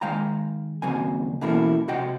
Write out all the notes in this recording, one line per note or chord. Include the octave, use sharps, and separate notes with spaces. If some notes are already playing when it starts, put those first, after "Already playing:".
D#3 G#3 F5 G5 A#5
D#2 C#3 F#3 C4 G#5
B2 E3 A#3 C#4 E4 A4
C3 F#4 D#5 F#5 G5